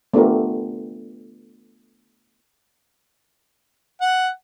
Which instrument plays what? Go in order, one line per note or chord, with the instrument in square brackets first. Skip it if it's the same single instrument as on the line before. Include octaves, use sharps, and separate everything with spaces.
[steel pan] A3 B3 D4 F4 G4 A#4
[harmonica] F#5